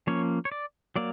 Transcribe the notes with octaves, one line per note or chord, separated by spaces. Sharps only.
F3 A#3 C#4 C#5
C#5
D5
F#3 A#3 D5